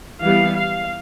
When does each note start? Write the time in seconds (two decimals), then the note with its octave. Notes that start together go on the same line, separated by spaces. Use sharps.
0.22 E3 G3 B3 F5
0.56 F5